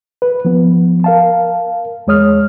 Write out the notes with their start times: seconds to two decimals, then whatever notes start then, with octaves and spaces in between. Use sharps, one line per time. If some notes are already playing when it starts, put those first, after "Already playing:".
0.22 B4
0.45 F3 B3
1.04 A#4 F5 A5
2.07 E2 G#3 C#5 D#6 F6